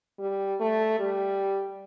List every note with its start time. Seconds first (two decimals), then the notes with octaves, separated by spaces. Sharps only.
0.19 G3
0.60 A3
0.99 G3